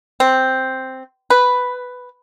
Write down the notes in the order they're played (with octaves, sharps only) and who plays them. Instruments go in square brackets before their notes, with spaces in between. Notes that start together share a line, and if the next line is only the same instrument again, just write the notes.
[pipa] C4
B4